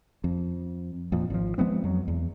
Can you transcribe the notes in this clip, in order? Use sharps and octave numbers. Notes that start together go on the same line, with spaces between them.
F2
F2 A#2 F3
G#1 F3
F3 G#3 B3 C4
F2 F#3
E2